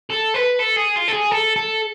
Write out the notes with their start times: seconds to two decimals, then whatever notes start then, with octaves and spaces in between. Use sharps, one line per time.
0.10 A4
0.34 B4
0.59 A4
0.76 G#4
0.96 F4
1.08 A4
1.13 G#4
1.31 A4
1.56 A4